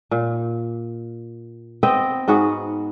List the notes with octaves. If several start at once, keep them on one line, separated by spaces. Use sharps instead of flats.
A#2
B3 C4 D#5 G5
G#2 B3 F#4 G#4